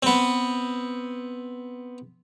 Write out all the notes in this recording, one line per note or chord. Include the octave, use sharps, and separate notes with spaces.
B3 C4